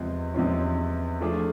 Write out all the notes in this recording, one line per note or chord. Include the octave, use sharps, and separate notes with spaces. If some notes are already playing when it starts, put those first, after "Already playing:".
Already playing: E2 C3 F3 G#3
E2 C3 F3 G#3 C#4
F3 A3 D4 F4 G#4